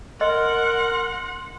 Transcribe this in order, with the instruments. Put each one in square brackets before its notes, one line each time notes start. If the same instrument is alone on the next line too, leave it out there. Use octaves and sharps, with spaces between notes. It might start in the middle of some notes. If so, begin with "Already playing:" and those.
[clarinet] A#4 [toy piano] D#5 [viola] F#5 [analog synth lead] C6